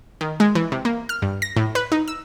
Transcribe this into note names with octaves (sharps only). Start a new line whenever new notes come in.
D#3
G#3
E3
C3
A#3
F6
G2
A#6
A2
B4
D#4
E6